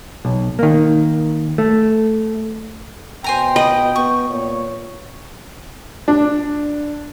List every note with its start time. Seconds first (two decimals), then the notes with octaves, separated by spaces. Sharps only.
0.25 B1
0.59 D#3 A#3
1.58 A3
3.24 B2 C5 G5 G#5 A#5
3.56 D#5 B5 D#6
3.96 B3 C#6
4.29 A#2 C#5
6.08 D4